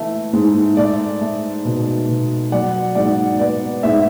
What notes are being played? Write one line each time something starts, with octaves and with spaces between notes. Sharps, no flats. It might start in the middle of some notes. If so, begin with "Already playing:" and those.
Already playing: E3 A3
G#2
A3 D5
A3
B2
B2
F#3 D5 F#5
G#2 D5 F#5
B3 D5
G#2 E5